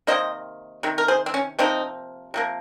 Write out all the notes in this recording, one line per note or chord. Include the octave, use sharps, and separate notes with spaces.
C3 D#3 A#3 C5 D#5
C3 D#3
A#4
G#4 C5
C4
C#4
C3 F3 A#3 C4 D#4
C3 F3 A#3